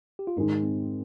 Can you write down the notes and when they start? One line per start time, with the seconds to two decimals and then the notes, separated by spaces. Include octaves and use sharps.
0.19 G4
0.27 F4
0.37 G#2 D#3 G#3 D#4
0.64 C4